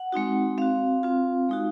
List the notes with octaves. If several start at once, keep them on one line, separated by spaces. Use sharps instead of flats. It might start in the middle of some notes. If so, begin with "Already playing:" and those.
Already playing: F#5
G#3 C4 D#4 F#4
C4 F#4 F5
C4 F4
G#3 D#4 F#4